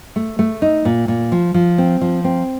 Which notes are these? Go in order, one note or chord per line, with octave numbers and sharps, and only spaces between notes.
A3
A3
D#4
A#2
A#2
F3
F3
C4
F3
C4